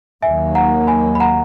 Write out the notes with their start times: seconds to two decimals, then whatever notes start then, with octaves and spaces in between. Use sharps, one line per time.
0.22 D#2 D#3 F#3 A#3 E5 G#5
0.55 F#5 A#5
0.87 G#5 B5
1.15 B5
1.20 F#5 A#5